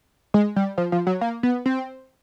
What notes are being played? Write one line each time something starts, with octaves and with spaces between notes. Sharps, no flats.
G#3
G3
F3
F3
F#3
A#3
B3
C4